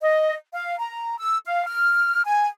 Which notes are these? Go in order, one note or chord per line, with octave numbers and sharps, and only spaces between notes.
D#5
F5
A#5
E6
F5
F6
G#5